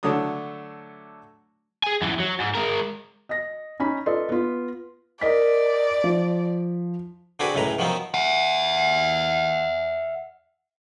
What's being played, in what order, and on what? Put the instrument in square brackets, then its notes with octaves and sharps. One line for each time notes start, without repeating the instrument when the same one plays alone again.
[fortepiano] D3 F#3 A3 D4 D#6
[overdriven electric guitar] G#4 G#5
F#2 E3
F#3
G#2
G#3 A#4
[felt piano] D#5 A#6
C#4 D#4 B5
F4 A4 B4 D5 D#5 C6
B3 F4
[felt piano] A#4 D#5 B6 [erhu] D5
[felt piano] F3
[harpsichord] D3 C4 D4 F#4 G#4 B4
C#2 F#2 A2 G#3 B4 A#5
D#3 F3 F#3 B3 C4 D#4
[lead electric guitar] E5 F#5